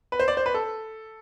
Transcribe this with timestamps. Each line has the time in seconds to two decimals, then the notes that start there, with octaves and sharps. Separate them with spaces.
0.12 B4
0.20 C5
0.28 D5
0.37 C5
0.46 B4
0.54 A4